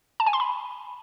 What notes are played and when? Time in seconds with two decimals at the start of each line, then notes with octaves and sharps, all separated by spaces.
0.20 A5
0.26 G#5
0.33 C6
0.40 B5